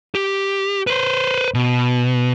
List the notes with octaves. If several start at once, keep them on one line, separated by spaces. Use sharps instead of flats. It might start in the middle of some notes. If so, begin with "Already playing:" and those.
G4
B4 C5
B2